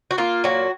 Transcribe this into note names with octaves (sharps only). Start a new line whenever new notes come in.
F#4
A#3 F4
A#2 F#3 F#4